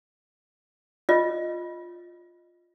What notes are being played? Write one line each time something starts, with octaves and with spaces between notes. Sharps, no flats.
F4 D#5